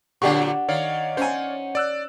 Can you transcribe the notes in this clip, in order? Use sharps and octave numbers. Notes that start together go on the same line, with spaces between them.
A#2 D3 F#3 D4 G4 F#5 C#6
D#3 C#5 D5 F5
C#4 C5 G#5
D5 E6 F#6